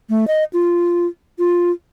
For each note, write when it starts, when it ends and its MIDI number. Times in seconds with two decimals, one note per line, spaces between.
0.10 0.27 57
0.27 0.44 75
0.53 1.07 65
1.39 1.71 65